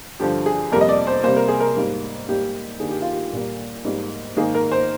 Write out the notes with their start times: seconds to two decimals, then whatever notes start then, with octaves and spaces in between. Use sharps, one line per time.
0.20 G2 D3 F3 G4
0.46 G#4
0.72 F2 C3 G3 A#3 A#4
0.81 D#5
0.89 D5
1.07 C5
1.23 C3 G3 A#3 C5
1.36 A#4
1.48 G#4
1.60 A#4
1.76 G#2 G3 A#3
2.28 G#2 G3 A#3 G4
2.80 G2 D#3 G3 A#3 G#4
2.91 G4
3.02 F4
3.12 G4
3.32 A#2 G3 A#3
3.85 G#2 G3 A#3
4.36 G#2 D#3 A#3 G#4
4.55 A#4
4.72 C5